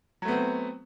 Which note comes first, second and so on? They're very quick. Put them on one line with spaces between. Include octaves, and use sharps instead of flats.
F#3 A3 B3 C4